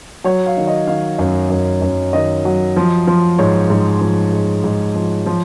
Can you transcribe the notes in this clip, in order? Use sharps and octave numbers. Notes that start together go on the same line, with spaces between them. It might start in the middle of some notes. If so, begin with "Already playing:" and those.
F#3 C#5
F5
D#3
D#5
D#3 F5
F#2
F#2
F#2
D#3 D#5
F#3
F3
F3
G#2 C#5
G#2
F3
G#2
G#2
F3
F3